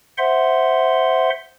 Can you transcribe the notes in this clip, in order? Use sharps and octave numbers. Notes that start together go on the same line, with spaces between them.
C5 E5 F#5 C6